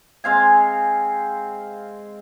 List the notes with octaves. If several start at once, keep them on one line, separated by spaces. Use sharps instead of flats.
G#3 C4 F5 G#5